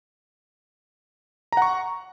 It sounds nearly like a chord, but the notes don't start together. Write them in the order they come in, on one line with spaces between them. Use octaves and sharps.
A#5 F#5 C#6